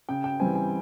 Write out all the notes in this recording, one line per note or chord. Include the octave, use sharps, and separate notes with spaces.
C#3 G5
G5
E3 G3 C4 G#5
G#5